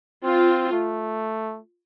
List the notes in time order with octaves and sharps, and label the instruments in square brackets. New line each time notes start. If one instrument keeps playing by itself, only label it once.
[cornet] C4 [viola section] F4
[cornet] A3